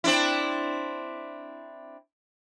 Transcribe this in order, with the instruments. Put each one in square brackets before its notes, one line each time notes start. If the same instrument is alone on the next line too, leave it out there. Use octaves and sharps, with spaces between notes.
[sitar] C4 D4 E4